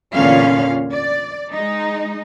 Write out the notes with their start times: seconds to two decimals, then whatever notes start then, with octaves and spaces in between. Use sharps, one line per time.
0.14 E2 A#2 D3 C#4 F5
0.93 D5
1.53 G#3 D#4